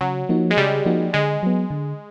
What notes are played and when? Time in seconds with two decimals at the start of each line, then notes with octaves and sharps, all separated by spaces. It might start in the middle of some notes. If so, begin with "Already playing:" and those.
0.01 C#3 F#3
0.29 F3 A#3 D#4 F#4
0.51 G#3
0.57 C#3 G3
0.86 F3 A#3 D#4 F#4
1.13 D3 G#3
1.43 F#3 B3
1.70 D3